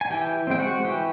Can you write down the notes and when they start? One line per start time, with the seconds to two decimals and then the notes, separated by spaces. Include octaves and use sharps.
0.01 G#5
0.10 E3 G4 G5
0.47 G#3 C4 G5
0.60 F#4 F#5
0.84 E3 G4 G5